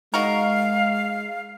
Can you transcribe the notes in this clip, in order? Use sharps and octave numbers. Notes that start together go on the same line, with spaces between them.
G#3 D#4 F#4 A#4 F5